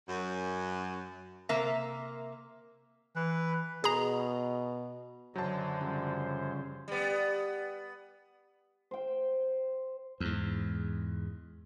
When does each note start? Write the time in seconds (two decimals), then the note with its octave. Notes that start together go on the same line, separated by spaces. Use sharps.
0.08 F#2
1.49 C3 A#3 A#4 E5 A#5
3.16 E3 B4
3.84 B2 G#4 A#5
5.36 F#2 D3 F#3 C5 A5
5.81 C#3 F3 G3
6.88 G3 B3
8.91 C5 G5
10.20 E2 G#2